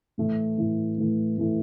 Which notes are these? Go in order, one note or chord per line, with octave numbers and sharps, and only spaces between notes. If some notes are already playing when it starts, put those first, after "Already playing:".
A2 E3 A3
A2 E3 A3
A2 E3 A3
A2 E3 A3